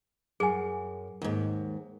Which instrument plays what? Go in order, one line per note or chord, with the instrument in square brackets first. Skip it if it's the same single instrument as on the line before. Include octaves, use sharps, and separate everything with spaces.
[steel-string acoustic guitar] F#2 [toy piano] G#4 G#5
[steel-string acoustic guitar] D#2 G#2